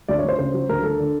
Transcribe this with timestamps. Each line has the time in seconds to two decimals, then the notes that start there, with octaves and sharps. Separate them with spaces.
0.08 D2 D5
0.19 C#5
0.24 D2 C5
0.39 C#3 C5
0.54 F#3
0.69 D2 A#4
0.84 D2 A4
1.00 D3